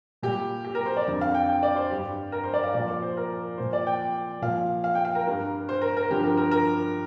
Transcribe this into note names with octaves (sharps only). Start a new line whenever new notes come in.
A#2 G3 G4
G4
A#4
C5
D5
F2 D3 G3
F5
G5
G5
D5
C5
G2 G3 G4
A#4
C5
D5
F5
A#2 F3 D5
D5
C5
A#4
A#2 F3 C5
D5
G5
A#2 F3 F5
F5
G5
F5
A#4
G2 G3 A#4
C5
A#4
A#4
G2 D3 F3 G4
A#4
A#4
A#4